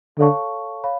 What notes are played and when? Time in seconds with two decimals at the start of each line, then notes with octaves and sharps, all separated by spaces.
0.18 D3 A4 C#5 F5 A5 C#6
0.84 C#5 F5 B5